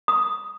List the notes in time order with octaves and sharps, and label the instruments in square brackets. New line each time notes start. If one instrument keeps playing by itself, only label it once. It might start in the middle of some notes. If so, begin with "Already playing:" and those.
[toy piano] D#6